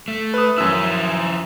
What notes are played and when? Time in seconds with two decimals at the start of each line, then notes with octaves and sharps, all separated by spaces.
0.08 A3
0.34 B4 D#6
0.58 F#2 F3 E4 E6